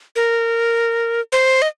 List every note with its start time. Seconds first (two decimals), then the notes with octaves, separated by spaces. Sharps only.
0.16 A#4
1.32 C5
1.62 D#5